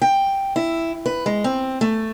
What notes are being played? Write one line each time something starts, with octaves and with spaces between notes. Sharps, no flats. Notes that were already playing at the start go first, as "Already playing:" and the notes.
G5
E4
B4
G#3
C4
A3